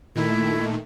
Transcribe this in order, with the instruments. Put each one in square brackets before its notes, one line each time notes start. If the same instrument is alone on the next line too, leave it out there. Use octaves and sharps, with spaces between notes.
[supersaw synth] A#2 D#3 A3 [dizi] E4